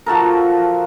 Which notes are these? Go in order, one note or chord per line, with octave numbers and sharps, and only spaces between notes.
F3 F#4 A4 A#4